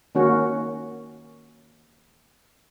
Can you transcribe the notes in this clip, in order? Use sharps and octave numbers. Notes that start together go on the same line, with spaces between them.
D#3 A#3 C#4 F#4